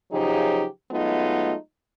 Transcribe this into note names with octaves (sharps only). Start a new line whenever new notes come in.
C#3 F3 F#3 D#4 G4 G#4
F#3 G#3 A3 B3 D#4 F4